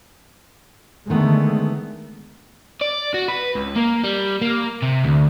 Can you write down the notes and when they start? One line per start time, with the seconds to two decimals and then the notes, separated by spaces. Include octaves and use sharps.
1.10 D3 D#3 G#3 A3 B3
2.82 D5
3.14 F#4
3.28 B4
3.56 C#2
3.76 A#3
4.04 G3
4.41 A#3
4.82 C3
5.04 D2